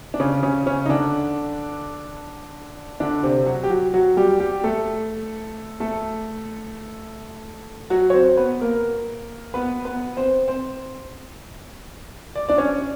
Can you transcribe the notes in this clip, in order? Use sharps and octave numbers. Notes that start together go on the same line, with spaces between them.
D4
C#3 C#4
C#3 C#4
C#3 C#4
D#4
D3 D4
D3 D4
C3 C4
F#3 F#4
G4
F#3 F#4
F#3 F#4
G3 G4
G3 G4
A3 A4
A3 A4
F#3 F#4
C#5
C4 C5
B3 B4
A#3 A#4
B3 B4
B3 B4
C4 C5
C4 C5
D5
D4 D5
C#4 C#5